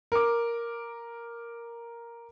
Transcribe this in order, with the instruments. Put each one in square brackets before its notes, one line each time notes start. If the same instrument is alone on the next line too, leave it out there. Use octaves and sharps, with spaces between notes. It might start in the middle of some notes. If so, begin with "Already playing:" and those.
[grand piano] A#4 D6